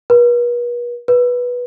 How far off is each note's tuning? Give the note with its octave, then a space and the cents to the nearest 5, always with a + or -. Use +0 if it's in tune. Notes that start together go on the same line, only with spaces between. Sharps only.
B4 -45
B4 -10